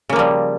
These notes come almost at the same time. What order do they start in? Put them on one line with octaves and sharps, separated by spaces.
C#3 A#3 F3 G3